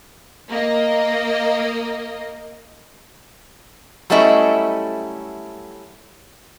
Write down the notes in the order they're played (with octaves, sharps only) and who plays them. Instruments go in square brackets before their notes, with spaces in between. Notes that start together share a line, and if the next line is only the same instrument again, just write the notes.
[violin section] A#3 D#5
[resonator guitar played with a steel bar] F#3 G3 A3 C#4 E4 D#5